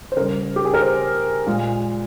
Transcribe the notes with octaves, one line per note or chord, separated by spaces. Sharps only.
C5
C#3 G3 A#4
G4
G#4
A#4
C5
A#2 G#3